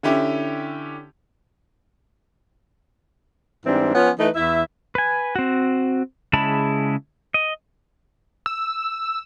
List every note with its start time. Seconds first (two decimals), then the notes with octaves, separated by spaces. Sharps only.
0.03 D3 C#4 E4 G4
3.66 G#2 E3 G3 C4 D4
3.94 F3 B3 C#4
4.18 E3 A3 D#4 B4
4.35 E2 E4 E5
4.95 B4 G#5
5.36 C4 F#4
6.33 C#3 G#3 E4 A5 B5
7.34 D#5
8.46 E6